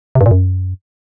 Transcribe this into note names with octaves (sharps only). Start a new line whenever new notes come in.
C3
G2
A#2
F#2